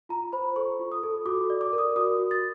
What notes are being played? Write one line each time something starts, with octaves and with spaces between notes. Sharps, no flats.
F4 A#5
C5 B5
A4 C#6
F4
D#6
A4
F#4 D6
D5
D6
A#4
D#6
F#4 D#6
F#4
A6